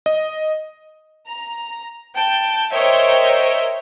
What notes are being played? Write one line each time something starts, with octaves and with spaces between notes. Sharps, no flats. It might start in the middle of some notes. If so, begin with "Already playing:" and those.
D#5
A#5
G5 A5
A#4 C5 C#5 D#5 E5 G5